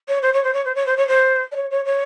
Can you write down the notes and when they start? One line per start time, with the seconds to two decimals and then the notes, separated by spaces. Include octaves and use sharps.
0.08 C#5
0.22 C5
0.33 C#5
0.44 C5
0.54 C#5
0.65 C5
0.75 C#5
0.86 C5
0.97 C#5
1.07 C5
1.52 D5
1.56 C#5
1.71 C#5
1.85 C#5